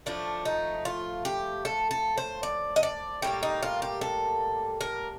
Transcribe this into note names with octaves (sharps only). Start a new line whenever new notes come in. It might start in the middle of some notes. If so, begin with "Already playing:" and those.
A2 F3 A3 D4
D#4
F4
G4
A4
A4
C5
D5
D#5
D5
A2 G3 A#3 G4
D#4
F4
G4
A4
A#4